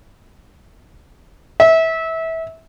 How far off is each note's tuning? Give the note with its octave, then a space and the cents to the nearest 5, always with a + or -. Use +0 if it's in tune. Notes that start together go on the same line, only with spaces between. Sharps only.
E5 -20